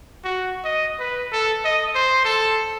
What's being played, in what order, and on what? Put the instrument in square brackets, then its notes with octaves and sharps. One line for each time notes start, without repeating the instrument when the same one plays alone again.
[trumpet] F#4
D#5
B4
A4
D#5
C5
A4